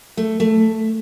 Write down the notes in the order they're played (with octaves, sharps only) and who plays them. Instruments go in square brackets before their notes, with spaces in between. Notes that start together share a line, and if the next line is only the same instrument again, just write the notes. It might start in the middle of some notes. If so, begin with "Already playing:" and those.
[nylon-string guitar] A3
A3